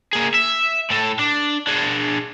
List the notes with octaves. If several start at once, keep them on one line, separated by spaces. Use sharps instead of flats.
A#3 G#4
E5
A2 A4
D4
D4 G#4